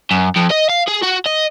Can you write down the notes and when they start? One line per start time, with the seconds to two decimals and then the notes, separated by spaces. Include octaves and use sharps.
0.11 F#2
0.36 F2
0.51 D#5
0.69 F5
0.88 G#4
1.03 F#4
1.26 D#5